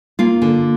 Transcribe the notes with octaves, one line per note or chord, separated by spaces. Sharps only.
A#3 F4
D3